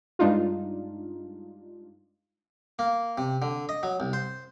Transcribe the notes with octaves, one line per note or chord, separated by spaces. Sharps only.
G2 G#3 D4 D#4 F4
A#3
C3
D3
D#5
F#3
C2
C5